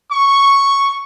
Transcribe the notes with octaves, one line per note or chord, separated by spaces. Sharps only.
C#6